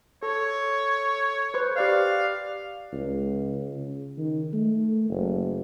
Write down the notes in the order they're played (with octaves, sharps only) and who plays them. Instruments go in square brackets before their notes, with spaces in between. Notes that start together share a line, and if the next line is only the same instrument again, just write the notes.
[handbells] A4 [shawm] C#5
[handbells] B4 C5 C#6
[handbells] G4 D5 F#6 [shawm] F5
[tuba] C#2
C#3
D#3
A3
F#1